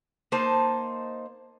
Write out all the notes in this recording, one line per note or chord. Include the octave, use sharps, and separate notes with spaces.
A#3 D#4 C5 A5